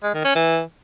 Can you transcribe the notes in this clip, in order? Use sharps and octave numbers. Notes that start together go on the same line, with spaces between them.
G#3
D#3
C#4
E3